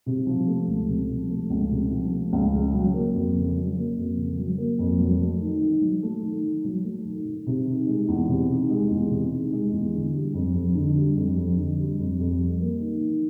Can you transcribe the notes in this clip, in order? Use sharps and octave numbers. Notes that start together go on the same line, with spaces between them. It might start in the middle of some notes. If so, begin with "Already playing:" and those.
C3
F3
A3
C#2
C3
F3
A3
C#2
C3
F3
A3
C#2
C#3
F#3
A#3
F2
C#3
F#3
A#3
F2
C#3
F#3
A#3
F2
F#3
A3
D#3
D#3
F#3
A3
D#3
D#3
F#3
A3
D#3
D#3
C3
D#3
G#3
E2
C3
D#3
G#3
E2
C3
D#3
G#3
E2
D3
G3
F2
F2
D3
G3
F2
F2
D3
G3
F2
F2
G3
A#3
D#3
D#3